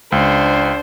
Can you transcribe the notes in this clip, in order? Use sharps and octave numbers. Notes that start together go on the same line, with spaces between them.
C#2 D4 C5